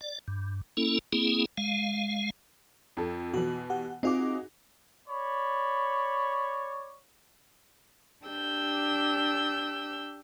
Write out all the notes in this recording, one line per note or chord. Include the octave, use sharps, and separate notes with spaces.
D5
G2
A#3 C#4 E4 A4
A#3 C4 E4 G#4
G#3 F5
F2 A4
B2 E3 F#4
G4 F#5
C4 D#4 F4 F#4 G#4 D6
C#5 D5 B5
D4 G4 E6 G6